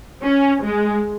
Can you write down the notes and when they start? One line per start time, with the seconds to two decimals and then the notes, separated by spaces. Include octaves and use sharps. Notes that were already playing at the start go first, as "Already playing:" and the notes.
0.23 C#4
0.62 G#3